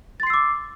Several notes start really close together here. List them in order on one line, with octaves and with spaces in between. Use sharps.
A6 C6 C7 E6 D6